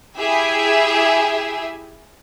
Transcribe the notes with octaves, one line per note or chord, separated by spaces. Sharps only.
E4 G4 G#4 E5 G#5